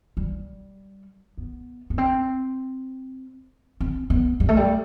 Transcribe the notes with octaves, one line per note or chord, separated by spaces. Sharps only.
G3
B3
B3
C4
C4
B3
G3
A3
G3